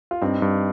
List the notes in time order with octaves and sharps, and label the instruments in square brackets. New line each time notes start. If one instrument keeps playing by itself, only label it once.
[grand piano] F4
[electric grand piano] G2 [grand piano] C4 D#4
[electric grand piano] G2